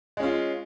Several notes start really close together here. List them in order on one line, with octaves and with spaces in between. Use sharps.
G#3 C#4 F4